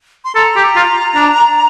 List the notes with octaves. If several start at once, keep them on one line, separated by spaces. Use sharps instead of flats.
C6
A4 A#5
G4
F4
D4